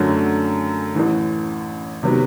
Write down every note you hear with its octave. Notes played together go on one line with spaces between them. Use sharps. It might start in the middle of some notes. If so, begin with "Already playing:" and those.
Already playing: F#2 D3 F#3 A3 C#4
A1 A2 E3
C3 D#3 F#3 B3